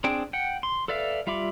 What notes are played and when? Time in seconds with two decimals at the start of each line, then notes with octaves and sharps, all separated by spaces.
0.04 C4 D4 G#4 G5
0.33 F#5 G5
0.63 C6
0.88 A4 B4 D5 E5 F5
1.27 G3 F4 E5 B5 D6